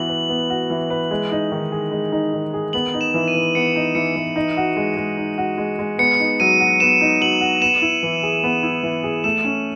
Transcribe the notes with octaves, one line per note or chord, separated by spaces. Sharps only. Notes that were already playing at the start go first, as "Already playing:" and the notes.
Already playing: E3 B3 F#4 F#7
B4
B3
F#4
E3
B4
G#3
D#4
D#3
G#4
G#3
D#4
D#3
G#4
B3 F#7
D#4
E7
E3
D#7
E3
B3 C#7
D#4
E3 C#7
E3
D#4
F#4
G#3
G#3
D#4
F#4
G#3
G#3
B3 C#7
D#4
F#3 D#7
F#4
B3 E7
D#4
F#3 F#7
F#4
B3 E7
E4
E3
G#4
B3
E4
E3
G#4
A3 E7
C#4